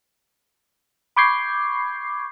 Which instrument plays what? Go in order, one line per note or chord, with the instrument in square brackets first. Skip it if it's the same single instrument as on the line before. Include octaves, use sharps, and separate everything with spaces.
[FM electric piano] B5 C#6 D6 G6 G#6 C7